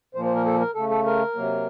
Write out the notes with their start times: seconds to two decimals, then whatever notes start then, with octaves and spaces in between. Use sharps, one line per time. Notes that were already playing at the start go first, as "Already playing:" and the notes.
0.15 A#2 F3 A#3 C5
0.25 C5
0.35 A#4
0.45 A4
0.60 A#4
0.74 C#3 A3 A4
0.90 A4
1.06 A#4
1.35 C3 F#3 A#3